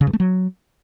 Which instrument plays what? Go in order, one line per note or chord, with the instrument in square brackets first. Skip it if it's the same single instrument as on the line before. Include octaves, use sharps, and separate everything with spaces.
[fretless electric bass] C#3
G2
A3
F#3